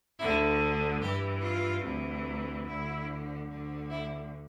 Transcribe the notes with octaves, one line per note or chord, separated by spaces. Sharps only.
D2 D3 E4
G2 E3 G4
F4
D2 C3 E3
D2 D3 E4
D2 D3
E4